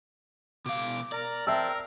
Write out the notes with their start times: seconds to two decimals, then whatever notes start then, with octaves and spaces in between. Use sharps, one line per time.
0.66 B2 F5 D6
1.12 A#4 D5 A#5
1.47 C4 A#4 E5 A5 E6